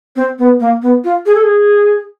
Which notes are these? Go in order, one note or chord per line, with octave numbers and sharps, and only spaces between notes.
C4
B3
A#3
B3
F4
G#4
A4
G#4